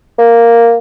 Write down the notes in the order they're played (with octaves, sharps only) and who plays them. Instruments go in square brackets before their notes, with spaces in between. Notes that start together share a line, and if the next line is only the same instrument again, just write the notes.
[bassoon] A#3